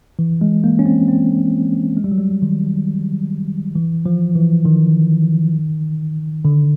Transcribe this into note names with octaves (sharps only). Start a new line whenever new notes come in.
E3
G#3
A#3
C#4
C4
C4
G#3
G3
F#3
G3
D#3
E3
F3
E3
D#3
D3